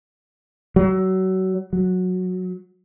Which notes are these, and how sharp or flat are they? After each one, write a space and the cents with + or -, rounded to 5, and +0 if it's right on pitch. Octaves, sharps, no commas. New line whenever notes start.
F#3 +25
F#3 -15